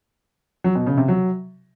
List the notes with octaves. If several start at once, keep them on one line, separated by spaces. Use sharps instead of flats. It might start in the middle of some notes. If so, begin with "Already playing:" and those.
F#3
B2
C#3
C3
F#3